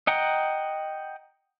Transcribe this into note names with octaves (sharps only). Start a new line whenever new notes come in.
D#5 F#5 G5 A#5